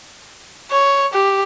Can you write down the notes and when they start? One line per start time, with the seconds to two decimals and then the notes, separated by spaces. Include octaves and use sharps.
0.71 C#5
1.13 G4